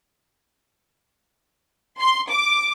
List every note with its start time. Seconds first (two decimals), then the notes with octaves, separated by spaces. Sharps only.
1.98 C6
2.30 D6